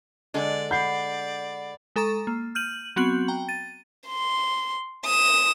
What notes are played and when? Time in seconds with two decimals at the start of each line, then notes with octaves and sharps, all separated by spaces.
0.34 D3 G#3 D5 G#5
0.71 D5 F#5 B5 G6 C7
1.96 G#3 A4 A#5 C#6 A6
2.27 A#3
2.55 F6 G6 D#7 F#7
2.96 F#3 B3 C4 F#4 G6 F#7
3.28 G5 A#5
3.48 A6 D#7
4.08 C6
5.05 D#6 E7